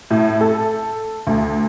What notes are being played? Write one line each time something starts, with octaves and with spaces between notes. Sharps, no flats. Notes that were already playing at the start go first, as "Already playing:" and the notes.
A2
A4
D2